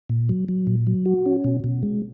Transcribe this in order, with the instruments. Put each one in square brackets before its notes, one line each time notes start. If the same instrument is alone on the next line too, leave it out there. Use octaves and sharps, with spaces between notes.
[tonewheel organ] A#2
F#3
F#3
A#2
F#3
F#4
C#4
B2
B2
G#3